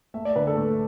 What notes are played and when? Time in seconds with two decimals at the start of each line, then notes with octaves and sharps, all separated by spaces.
0.14 A3 E5
0.25 D5
0.36 D3 B4
0.47 A4
0.57 A3